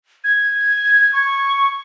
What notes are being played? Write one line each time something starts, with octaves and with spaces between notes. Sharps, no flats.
G#6
C#6